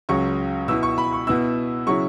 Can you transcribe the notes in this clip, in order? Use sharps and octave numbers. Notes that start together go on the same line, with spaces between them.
C#2 C#3 F#3 C#6
B2 B3 E4 E6
C#6
B5
C#6
B2 B3 E4 E6
C#3 F#3 E4 C#6